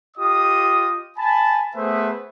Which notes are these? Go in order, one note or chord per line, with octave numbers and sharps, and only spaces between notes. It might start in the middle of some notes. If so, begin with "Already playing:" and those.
F4 G4 D#5 D#6
G#5 A5 B5
A3 B3 G#4 B4 C5 E5